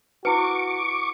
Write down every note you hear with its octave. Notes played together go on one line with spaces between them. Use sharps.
E4 F#4 B4 C#6 D6